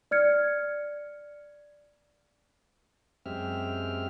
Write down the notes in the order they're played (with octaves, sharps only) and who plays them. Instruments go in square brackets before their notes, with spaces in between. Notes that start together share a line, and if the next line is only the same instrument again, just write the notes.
[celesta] D5 F6 G#6 C#7
[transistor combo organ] F#2 G#3 C4 G4 E5 F6